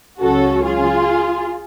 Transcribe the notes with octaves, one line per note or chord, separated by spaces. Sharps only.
C#2 C#3 F#3 C#4 F#4 A4
F4 G#4